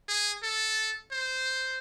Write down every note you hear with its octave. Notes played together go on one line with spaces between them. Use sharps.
G#4
A4
C5